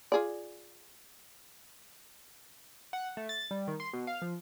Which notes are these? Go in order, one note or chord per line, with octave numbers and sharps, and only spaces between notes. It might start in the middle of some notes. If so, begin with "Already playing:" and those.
F4 G#4 D5
F#5
A3
A6
G3
D#3
C6
B2
F5
F3